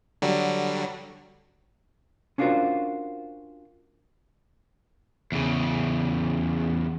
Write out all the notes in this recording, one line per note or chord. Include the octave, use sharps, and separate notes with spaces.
D3 F#3 G3
C#4 D4 F4 F#4 A#4 C5
E2 C#3